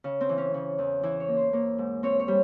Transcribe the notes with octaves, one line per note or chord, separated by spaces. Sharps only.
C#3
C4
E3
C#4
C#3
E2
E3 E4
C#5
A#3
C5
A#3 C#5
G#2
C4 C#5
C#5
G3